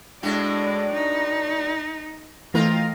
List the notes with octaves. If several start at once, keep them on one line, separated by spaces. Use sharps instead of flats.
A2 G#3 D4 F#4 D5
D#4
E3 A3 C4 F4 A#4 D#5 F5